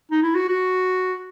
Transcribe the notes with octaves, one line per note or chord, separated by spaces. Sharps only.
D#4
E4
F#4
F#4